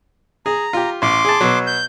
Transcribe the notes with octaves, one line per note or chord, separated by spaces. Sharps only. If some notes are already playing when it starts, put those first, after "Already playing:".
G#4 A#5
F4 G4
A1 C6 D6
G#4 A5
B2 F#3
G6